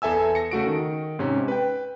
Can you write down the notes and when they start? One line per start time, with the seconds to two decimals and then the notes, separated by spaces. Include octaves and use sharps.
0.02 E2 A4 E5 G#5 E6
0.35 A#6 C#7
0.51 C#3 A3 F#4 D7
0.67 D#3
1.19 G#2 C3 C#4
1.48 B4 G5